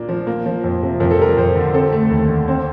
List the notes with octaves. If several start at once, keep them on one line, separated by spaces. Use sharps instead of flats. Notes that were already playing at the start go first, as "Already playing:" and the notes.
Already playing: A#2 A#3 D4
F3
A#3
F3
F2
C3
F2 A#4
A4
G3 A#4
F2 C5
D3
C4 A4
A3
D#2
D3
C4